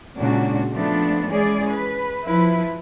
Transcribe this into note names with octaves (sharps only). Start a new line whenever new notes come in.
A#2 C#3 G#3 D4 F#4
F3 A3 B3 D4
E3 G#3 C#4 G#4 D5
B4
F3 E4 B4